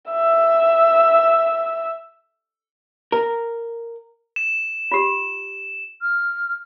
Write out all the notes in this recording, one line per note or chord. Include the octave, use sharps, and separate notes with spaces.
E5 E6
A#4
E7
F4 G4
F6